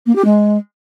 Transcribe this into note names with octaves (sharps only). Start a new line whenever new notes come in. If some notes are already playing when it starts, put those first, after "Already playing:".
A#3
G4
G#3